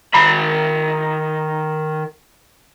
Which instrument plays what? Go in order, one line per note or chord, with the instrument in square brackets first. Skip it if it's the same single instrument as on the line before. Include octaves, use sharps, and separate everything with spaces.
[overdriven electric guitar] D#3 B5